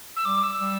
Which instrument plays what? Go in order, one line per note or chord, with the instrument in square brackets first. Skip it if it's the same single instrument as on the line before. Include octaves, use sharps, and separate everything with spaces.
[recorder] E6
[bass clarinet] G3 [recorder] D6
[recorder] E6
[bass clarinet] G3